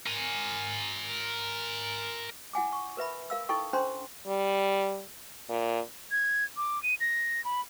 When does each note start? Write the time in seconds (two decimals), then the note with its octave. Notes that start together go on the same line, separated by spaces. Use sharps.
0.07 A#4 G#5
2.53 E4 F#5 G#5 D6
2.73 C#6
2.97 A#4 B4 E5 B5
3.30 A#4 F5 E6
3.49 D#4 E4 A4 G5 C#6
3.73 C#4 D4 C5 G5 A#5 C6
4.27 G3
5.49 A#2
6.11 G#6
6.57 D6
6.83 D#7
7.00 A#6
7.44 B5